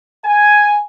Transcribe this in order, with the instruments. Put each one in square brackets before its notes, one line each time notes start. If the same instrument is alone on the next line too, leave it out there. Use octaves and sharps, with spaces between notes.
[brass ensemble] G#5